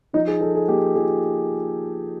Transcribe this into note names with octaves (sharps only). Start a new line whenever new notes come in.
F3 D#4
G#4
F3 A4
G#4
A#3 G4
F3 G#4